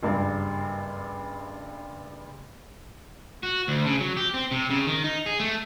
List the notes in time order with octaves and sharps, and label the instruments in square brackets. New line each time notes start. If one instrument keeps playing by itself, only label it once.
[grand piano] F#1 G2
[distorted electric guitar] F#4
D2
C#3
F#3
G4
C4
C3
C#3
D#3
D#4
G#4
A3